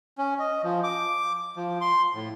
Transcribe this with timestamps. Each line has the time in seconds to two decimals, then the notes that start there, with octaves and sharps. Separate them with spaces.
0.18 C#4
0.39 D#5
0.63 F3
0.84 D6
1.56 F3
1.81 C6
2.14 A2